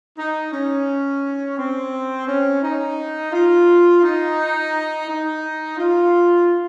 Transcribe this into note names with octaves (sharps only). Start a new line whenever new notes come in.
D#4
C#4
C4
C#4
D#4
F4
D#4
D#4
F4